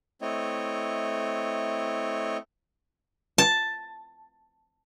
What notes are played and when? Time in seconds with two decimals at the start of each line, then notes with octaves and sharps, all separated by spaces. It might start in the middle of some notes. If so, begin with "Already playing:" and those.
0.21 A3 C4 E4 C#5 D#5
3.38 A5